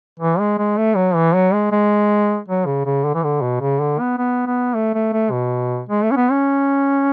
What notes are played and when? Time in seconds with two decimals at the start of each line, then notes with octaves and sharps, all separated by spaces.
0.20 E3
0.39 G#3
0.58 G#3
0.78 A3
0.96 F#3
1.15 E3
1.35 F#3
1.53 G#3
1.72 G#3
2.48 F#3
2.66 C#3
2.85 C#3
3.05 D3
3.15 E3
3.23 D3
3.42 B2
3.61 C#3
3.80 D3
4.00 B3
4.18 B3
4.47 B3
4.74 A3
4.95 A3
5.13 A3
5.31 B2
5.89 G#3
6.03 A3
6.11 C#4
6.17 B3
6.31 C#4